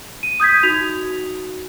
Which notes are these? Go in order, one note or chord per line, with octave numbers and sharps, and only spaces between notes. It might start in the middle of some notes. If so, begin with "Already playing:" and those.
D#7
D#6 G6 G#6 B6
D#4 F#4 F7